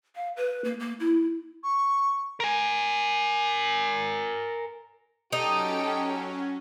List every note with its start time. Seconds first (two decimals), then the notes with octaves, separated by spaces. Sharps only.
0.16 F5
0.37 B4
0.64 A#3
0.80 A#3
1.00 E4
1.63 C#6
2.40 A#4 G#5
5.32 F#3 C#4 D#4 G4 A4 G5